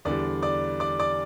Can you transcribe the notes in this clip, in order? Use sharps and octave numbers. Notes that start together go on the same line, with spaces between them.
E2 D3 G3 D5 D6
D5 D6
D5 D6
D5 D6